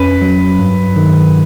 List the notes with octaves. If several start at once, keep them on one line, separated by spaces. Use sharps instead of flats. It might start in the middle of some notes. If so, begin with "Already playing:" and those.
Already playing: F2 C#4 B4
F#3
G2
D#3